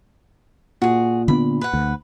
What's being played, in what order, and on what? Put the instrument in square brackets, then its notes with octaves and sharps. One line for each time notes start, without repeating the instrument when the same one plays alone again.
[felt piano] A#2 [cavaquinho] F#4 G#4
[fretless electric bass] D3 B3 D4 [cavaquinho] B5
[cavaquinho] B4 F#5
[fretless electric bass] D2